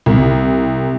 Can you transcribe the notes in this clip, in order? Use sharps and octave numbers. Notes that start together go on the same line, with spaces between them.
C2